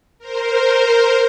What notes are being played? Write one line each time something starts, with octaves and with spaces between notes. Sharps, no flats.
A#4 C5